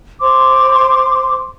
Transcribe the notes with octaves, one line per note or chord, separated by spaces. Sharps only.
C5 C6 D6